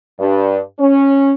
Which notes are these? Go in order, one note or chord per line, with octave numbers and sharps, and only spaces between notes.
G2
C#4